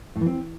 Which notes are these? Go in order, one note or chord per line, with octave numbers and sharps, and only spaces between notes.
A2
E3
C4